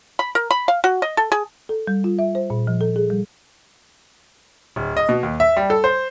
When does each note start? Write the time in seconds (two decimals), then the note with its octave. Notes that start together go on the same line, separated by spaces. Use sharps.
0.19 B5
0.35 A#4
0.51 B5
0.68 F5
0.84 F#4
1.02 D#5
1.17 A4
1.32 G#4
1.69 A4
1.87 G3
2.04 F4
2.19 E5
2.35 C5
2.50 A#2
2.67 F3
2.81 A4
2.96 G#4
3.10 G3
4.76 D1
4.97 D#5
5.09 B2
5.23 D#2
5.40 E5
5.57 G3
5.70 A4
5.84 C5